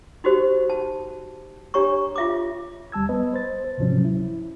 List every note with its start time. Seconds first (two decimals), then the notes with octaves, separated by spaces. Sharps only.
0.24 D#4 F#4 G4 C5
0.70 A5
1.74 D4 G4 C#5 A#5 C#6
2.16 F4 E5 D6
2.92 D#2 G3 A5 E6 G#6
3.09 B3 B4 D#5
3.33 C5 A6
3.64 C5
3.78 D2 G#2 C3 F3 F#3 C#4
4.05 E4